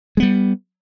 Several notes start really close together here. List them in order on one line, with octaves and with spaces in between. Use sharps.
G#3 B3 G3